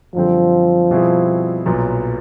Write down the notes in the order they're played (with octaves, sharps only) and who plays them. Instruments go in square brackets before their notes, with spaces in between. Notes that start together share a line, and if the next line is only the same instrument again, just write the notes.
[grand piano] F#2 D3 G3 C4 [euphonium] F3
[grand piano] B2 G3 C4 E4 G#4
B1 A#2 F#3 B3